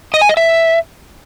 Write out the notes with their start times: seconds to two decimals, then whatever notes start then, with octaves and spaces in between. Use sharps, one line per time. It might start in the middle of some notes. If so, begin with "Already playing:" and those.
0.14 D#5
0.21 G#5
0.29 D#5
0.37 E5